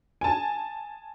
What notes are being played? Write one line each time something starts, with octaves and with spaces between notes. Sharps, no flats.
G#5 A5